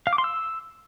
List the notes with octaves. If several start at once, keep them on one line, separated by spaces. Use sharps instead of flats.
F5
D6
C6
E6